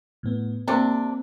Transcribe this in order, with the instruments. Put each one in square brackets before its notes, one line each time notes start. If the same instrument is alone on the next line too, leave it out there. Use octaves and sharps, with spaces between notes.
[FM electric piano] A2 B3
[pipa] C3 D4 [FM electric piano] A#3 C4